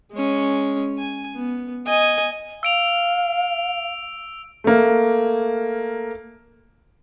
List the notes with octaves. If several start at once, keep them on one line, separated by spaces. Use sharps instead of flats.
G#3 C#4
G#5
B3
D#5 G#5
F5 E6 D7 F7
A3 A#3